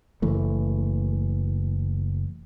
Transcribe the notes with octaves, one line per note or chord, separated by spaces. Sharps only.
F#1 E3 A3